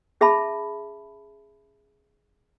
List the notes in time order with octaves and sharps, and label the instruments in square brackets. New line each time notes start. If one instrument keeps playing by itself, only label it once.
[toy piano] C#4 G#4 E5 A5 B5